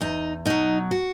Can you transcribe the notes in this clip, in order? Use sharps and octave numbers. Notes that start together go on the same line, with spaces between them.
E2 D#4
B2 F#3 D#4
F#4